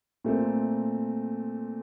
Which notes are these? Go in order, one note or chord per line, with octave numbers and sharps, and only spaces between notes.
A#2 A3 C4